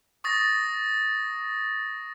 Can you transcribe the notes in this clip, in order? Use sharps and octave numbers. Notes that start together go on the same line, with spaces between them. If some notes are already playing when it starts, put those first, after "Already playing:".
C#6 D#6 A6 A#6